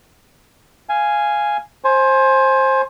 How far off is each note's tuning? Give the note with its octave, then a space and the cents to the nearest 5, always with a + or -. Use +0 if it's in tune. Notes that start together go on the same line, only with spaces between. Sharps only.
F5 -10 G#5 +0
C5 +20 G#5 +20